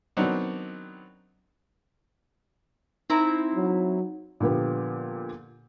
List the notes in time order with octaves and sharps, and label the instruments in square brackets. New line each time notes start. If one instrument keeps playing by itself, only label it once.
[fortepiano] D#3 F#3 B3 C4 D4 D#4
[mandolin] C4 E4 A#5 [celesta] D#4
[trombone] F#3
[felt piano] A#2 D3 F3 B3 G4